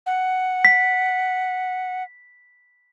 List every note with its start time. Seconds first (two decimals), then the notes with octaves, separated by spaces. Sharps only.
0.06 F#5
0.65 B6